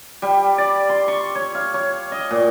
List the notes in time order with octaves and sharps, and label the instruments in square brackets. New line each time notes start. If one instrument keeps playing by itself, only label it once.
[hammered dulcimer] G3
D5
C6
C#6
C#5
F5
C#5
D#5
A#2